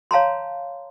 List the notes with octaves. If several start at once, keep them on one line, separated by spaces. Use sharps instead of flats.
C#5 F5 A5 A#5 C6